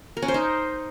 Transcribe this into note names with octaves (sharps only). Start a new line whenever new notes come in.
A#4
C#4
C5
D#4